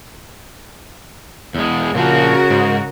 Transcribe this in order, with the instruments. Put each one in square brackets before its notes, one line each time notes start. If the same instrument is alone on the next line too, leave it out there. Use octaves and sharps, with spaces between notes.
[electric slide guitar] E2 G#3
[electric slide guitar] A#2 F3 [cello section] C#3 F#4 A#4
[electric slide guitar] G#2